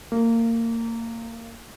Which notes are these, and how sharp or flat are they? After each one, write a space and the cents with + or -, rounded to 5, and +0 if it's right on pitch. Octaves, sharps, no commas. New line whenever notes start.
A#3 -25